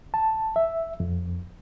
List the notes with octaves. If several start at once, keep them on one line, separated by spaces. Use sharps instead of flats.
A5
E5
F2